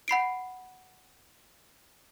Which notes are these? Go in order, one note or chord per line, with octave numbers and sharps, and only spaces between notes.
F#5 B5 C7 D7